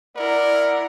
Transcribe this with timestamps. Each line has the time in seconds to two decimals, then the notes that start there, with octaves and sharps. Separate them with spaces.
0.16 E4 A#4 D5 F#5